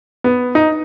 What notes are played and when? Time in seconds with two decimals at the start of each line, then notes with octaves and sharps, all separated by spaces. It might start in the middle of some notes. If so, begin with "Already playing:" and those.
0.24 B3
0.55 D#4